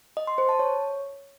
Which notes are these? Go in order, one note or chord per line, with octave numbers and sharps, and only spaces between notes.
D#5
C6
C5
A5
C#5